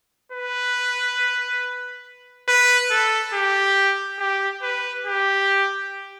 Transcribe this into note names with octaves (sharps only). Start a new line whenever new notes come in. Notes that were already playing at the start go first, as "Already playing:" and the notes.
B4
B4
A4
G4
G4
B4
G4